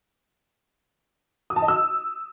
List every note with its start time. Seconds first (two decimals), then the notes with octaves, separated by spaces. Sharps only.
1.50 D#6
1.56 A5
1.62 D#5
1.68 E6